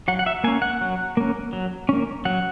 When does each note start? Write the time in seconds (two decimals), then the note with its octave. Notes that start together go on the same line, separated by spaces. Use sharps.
0.08 F#3 F#5
0.19 F#5
0.26 E5
0.44 A#3 G#5
0.47 C#4
0.62 F#5
0.81 F#3
1.17 A#3 C#4
1.53 F#3
1.89 A#3 C#4
2.25 F#3 F#5